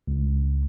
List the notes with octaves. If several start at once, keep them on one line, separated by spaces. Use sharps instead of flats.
C#2